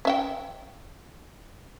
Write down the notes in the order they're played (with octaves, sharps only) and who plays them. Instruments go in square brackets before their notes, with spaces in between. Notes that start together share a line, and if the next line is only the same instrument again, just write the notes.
[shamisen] C#4 E5 G5